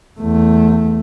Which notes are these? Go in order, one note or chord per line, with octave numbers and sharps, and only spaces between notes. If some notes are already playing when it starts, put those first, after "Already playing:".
E2 A3